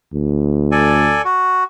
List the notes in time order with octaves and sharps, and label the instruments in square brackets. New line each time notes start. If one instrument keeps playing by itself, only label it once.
[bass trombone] D2
[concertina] A4 D5 G#5
F#4